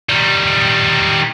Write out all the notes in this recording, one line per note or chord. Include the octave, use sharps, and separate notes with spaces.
D#3 G3